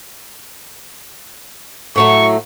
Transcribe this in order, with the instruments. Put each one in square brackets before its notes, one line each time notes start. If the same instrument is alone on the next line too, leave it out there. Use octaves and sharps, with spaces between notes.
[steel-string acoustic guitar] A2 F#3 A3 [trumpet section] C#6